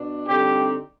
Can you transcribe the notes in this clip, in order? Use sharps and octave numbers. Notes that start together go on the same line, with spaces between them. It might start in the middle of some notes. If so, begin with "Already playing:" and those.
Already playing: B2 D4
D3 G3 C4 D#4 G4